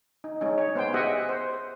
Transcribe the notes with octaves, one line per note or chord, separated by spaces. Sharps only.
D#4
G#3 C#4 D#4
C#5
B3 C5 G5
G4 G#4 D#5 E5 F#5 G#5
C5